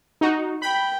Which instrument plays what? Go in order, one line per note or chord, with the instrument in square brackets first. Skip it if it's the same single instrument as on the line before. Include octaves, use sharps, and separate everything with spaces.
[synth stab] D#4 F#4
[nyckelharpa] G5 [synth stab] B5